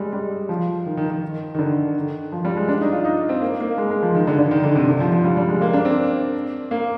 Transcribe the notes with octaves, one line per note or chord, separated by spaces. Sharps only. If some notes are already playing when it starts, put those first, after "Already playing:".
Already playing: G3 G#3
G3
F3
D#3
D#3
D#3
D#3
D3
D#3
F3
G3
G#3
D4
D#4
F4
D#4
C4
A#3
A#3
G#3
G#3
F3
D#3
D3
D3
D#3
D3
C3
D3
F3
F3
G3
G3
G#3
A#3
D4
C4
A#3